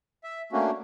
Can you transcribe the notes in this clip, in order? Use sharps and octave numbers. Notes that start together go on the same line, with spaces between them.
E5
A3 A#3 C#4 D4 F#4